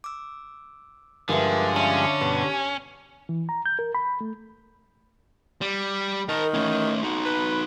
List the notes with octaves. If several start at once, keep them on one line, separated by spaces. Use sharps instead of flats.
D6 E6
G2 D3 F3 G#3 A#4 B4 E5
C#4 E5 F5 A5
G2 B2 G4
G#5
E3
A#5
G6
A#4
B5
A3
G3
D#3 A#4 A5
A3 C#4
D#4 F#4
B4